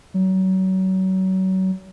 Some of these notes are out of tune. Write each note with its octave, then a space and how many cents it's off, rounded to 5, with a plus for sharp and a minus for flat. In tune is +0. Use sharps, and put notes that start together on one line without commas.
F#3 +30